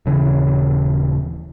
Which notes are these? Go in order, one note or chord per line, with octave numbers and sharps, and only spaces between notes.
D#1 C#3 E3 C#4